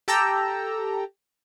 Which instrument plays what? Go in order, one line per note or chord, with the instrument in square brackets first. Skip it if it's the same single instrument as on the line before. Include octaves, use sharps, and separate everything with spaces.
[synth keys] G4 A4 G5 A5 A#5 E6